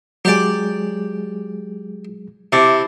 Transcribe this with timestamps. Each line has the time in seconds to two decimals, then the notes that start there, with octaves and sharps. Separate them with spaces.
0.25 F#3 G#3 G4 G#4 D5
2.52 C3 E4 A5 D6